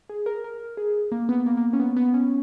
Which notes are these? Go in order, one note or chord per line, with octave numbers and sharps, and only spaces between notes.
G#4
A#4
A#4
G#4
A#3
B3
A#3
A#3
C#4
B3
B3
C#4